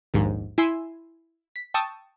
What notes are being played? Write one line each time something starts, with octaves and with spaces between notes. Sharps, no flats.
A#1 D#2 G#2
E4 G#5 C6 E6
B6
G5 A5 C#6 D#6 E6